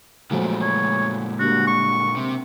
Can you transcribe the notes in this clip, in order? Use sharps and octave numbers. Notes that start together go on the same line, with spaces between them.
A#2 F3 F#3 G#3 A3
C#5
D3 G3 A#3 F#4
C#6
C3